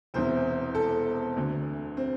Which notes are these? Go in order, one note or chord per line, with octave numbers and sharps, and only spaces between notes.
E1 E2 C3 E3 C5
A4
D2 D3
C4